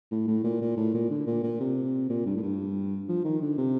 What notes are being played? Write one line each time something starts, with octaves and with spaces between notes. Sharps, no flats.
A2
A2
A#2
A#2
A2
A#2
D3
A#2
A#2
C3
A#2
G2
A2
G2
F3
D#3
D3
C3